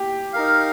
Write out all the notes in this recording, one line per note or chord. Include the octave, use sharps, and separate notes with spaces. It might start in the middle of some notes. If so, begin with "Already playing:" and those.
Already playing: G4
D#4 A#4 F5